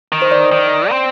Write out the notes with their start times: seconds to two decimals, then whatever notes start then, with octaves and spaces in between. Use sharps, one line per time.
0.12 D#3
0.22 C5
0.31 D5
0.52 D#3
0.90 C4